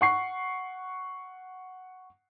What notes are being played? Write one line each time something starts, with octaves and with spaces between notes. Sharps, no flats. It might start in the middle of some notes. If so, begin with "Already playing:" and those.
F#5 C#6 C7